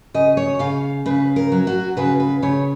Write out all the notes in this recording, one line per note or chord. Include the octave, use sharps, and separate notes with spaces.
C#3 D#5
C#5
C#3 F5
C#3 B4
A#4
F#3
F#4
C#3 B4
B4
C#3 C#5